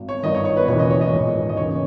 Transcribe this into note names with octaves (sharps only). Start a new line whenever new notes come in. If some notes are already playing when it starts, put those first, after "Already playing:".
Already playing: G#1
C#5
G1 G2 D#3 D#5
C#5
C#5
B4
E1 D#2 C#3 E3 C#5
D#5
C#5
D#5
A#1 G#2 D#3
D#5
D#2 C#3 E3 C#5